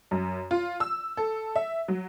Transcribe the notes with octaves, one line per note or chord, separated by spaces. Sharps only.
F#2
F4
E6
A4
E5
F#3